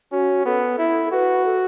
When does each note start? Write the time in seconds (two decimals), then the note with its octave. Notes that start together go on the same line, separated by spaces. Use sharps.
0.12 C#4 F#4
0.46 B3 A4
0.78 E4
1.12 F#4 B4
1.46 A4